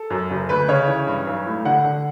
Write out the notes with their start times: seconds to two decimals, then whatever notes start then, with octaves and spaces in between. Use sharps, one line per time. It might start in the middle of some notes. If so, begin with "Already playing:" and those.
Already playing: A4
0.10 F#2
0.30 F#1
0.49 D2 B4
0.68 C#3 C#5
0.87 E3
1.07 G2
1.27 B1
1.46 A2
1.65 D3 F#5
1.84 D3